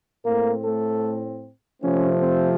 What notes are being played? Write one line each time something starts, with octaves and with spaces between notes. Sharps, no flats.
A2 A3 A#3 C4 A#4
A3 A4
C3 F3 A3 C4 C#4
C4